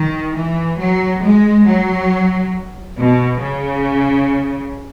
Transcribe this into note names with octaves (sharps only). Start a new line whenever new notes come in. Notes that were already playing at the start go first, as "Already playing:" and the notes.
Already playing: D#3
E3
F#3
G#3
F#3
B2
C#3